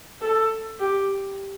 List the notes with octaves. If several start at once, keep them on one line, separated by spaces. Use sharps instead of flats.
A4
G4